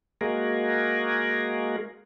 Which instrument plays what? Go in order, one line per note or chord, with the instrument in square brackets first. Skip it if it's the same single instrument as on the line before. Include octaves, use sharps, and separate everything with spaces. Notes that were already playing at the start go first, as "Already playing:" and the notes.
[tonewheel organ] G#3 A#3 F#4 G#4 A#4